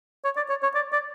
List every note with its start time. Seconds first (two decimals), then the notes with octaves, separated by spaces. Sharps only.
0.24 C#5
0.37 D5
0.49 C#5
0.63 C#5
0.75 D5
0.93 D5